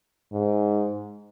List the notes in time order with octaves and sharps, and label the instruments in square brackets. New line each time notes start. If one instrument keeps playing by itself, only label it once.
[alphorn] G#2